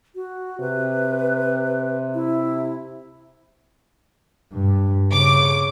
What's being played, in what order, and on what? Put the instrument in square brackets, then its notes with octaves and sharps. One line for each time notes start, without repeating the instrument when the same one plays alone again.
[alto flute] F#4
[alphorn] C3 [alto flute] B4
[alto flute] E4
[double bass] G2
[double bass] C#3 [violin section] D6